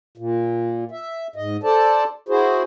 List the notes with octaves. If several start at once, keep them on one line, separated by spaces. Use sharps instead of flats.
A#2
E5
G#2 D#5
A4 C5 D5 A5
E4 F#4 G#4 C5